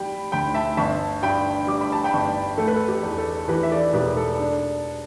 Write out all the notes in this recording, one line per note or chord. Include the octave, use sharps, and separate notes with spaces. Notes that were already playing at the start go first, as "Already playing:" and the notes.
Already playing: G3 G5 B5
D2 G5 B5
E5 A5
G1 E5 A5
G2 G5 B5
G3 D6
B5
A5
G5 B5
G1
A3 A4
B4
A4
G4
E2
A4
E3 G4 B4
E5
A4 D5
E1 G4 B4
A4
D4